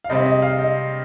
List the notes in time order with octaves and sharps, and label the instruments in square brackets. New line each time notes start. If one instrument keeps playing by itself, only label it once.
[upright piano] F5
C3 G3 C4 D#5
D#5
F5
D#5